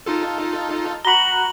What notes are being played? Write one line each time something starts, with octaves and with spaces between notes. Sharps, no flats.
D#4 F4 A4
F#4 A#5 B5 F#7 G7